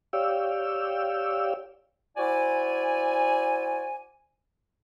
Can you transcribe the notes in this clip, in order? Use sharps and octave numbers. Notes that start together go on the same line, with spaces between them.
G4 C#5 D5 F5 G5 E6
E4 F#4 C5 D5 G#5